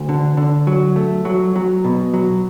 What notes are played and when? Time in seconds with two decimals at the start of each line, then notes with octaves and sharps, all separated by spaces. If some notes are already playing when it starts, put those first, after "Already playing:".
Already playing: D2
0.09 D3
0.37 D3
0.67 F#3
0.96 A3
1.25 F#3
1.56 F#3
1.84 B2
2.14 F#3